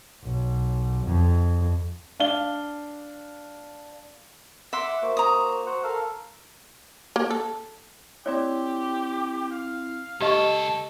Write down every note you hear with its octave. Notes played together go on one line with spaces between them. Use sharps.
B1
F2
D4 F5 G7
E5 F#5 C6 D6
A#3 F#4 C5
A#5 D#6
F#4 C5 F#5
A4 A#4 F5
A#3
A4
C4 E4 G4 C#5 D5
F5
C#2 G4 A4 D#5 C#6